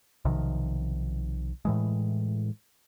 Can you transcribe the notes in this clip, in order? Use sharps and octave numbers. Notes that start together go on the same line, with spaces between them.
B1 C3 D#3 F3
A2 E3 G#3